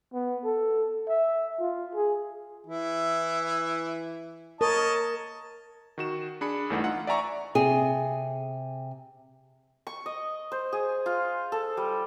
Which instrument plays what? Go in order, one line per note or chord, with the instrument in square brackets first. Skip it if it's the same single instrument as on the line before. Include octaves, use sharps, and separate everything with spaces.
[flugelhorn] B3
A4
E5
F4
G#4
[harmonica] E3 E4
[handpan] A#4 [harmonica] C#5 D#5 A5
[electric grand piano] D#3 F#4 E7
D4 G#4 B5 C#7
G1 D2 E3 A3 D#4 F#5
D#4 F4 F#5
D5 E5 G#5 A#5 C#6
[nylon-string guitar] C3 G#4
[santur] C#6
D#5
C5
G#4
F4
A4
G3